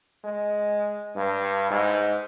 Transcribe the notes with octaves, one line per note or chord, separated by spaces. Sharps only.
G#3
G2
G#2